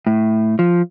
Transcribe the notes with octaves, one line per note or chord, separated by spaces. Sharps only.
A2
F3